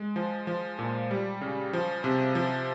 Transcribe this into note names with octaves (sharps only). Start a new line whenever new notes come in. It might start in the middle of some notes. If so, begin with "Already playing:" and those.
Already playing: G#3
F3
F3
A#2
G3
C#3
F3
C3
F3